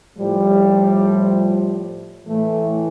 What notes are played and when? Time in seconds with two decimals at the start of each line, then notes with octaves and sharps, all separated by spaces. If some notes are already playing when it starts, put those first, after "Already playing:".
0.18 A2 F3 G3
2.27 A2 E3 A3